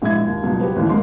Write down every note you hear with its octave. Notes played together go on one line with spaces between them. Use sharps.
A#1 G#3 E4 E5 G#6
D#2
C#2 G2 B2 F#3
F#4 G4 B4 C5
A1 D#2 D#3 E3
G#2 G#3 A#4 C6